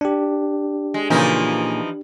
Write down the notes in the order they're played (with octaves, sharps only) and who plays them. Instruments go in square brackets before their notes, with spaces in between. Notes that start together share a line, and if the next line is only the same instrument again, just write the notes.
[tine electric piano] D4 G4
[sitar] G#3
[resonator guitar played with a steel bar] A#2 C#3 A#3 [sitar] E3 F3 D#4